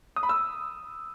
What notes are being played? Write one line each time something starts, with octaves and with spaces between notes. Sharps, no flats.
D#6
B5
E6